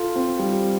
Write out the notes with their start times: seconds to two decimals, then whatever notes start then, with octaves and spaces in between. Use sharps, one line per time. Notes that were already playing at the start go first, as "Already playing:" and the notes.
Already playing: F4 A4
0.16 C4
0.39 G3